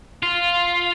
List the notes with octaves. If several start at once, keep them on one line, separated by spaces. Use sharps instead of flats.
F4